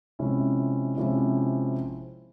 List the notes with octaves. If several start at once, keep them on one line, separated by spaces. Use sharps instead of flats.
C3 F3 G#3 C#4 E4
C3 F3 G#3 C#4 E4